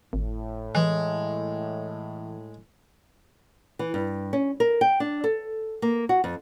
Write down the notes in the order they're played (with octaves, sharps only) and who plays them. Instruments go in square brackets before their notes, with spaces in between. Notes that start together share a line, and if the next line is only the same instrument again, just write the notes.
[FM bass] G#1 [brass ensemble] A2
[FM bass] E3 [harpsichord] G#3
[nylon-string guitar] E3
G2
C#4
A#4
G5
D4
A4
A#3
F#4
F2